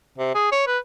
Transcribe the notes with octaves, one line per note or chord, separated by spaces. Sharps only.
C3
G#4
C#5
B4